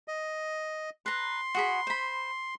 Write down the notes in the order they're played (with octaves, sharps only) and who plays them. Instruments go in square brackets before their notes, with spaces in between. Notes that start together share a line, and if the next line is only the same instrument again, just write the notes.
[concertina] D#5
[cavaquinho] B4 A#5 [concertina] C6
[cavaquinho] F#4 G#4 B5
C5 B5